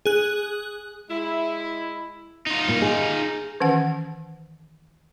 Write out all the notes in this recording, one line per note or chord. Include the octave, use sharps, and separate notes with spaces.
G#4 F#6
G#3 E4
D#4 F4
A#2
G#4
D#3 E3 C#4 F#5